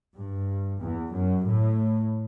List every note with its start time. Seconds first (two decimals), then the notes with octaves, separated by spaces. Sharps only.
0.14 G2
0.79 E2
1.11 F#2
1.43 A2